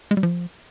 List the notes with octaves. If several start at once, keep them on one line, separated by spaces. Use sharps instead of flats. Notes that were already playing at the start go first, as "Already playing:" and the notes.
G#3
G3
F3